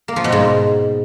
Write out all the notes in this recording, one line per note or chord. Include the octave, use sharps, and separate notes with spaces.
A#3
F3
B2
G#2